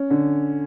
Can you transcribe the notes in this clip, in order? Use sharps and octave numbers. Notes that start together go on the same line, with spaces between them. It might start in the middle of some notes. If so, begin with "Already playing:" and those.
Already playing: C#4
D3